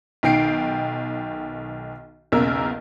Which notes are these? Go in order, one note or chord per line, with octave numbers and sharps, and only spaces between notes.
B1 D#3 G5 C7 D7
B1 E2 C#3 A#3 A#4 E6